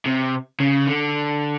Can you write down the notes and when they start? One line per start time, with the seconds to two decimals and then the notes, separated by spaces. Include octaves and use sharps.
0.06 C3
0.60 C#3
0.87 D3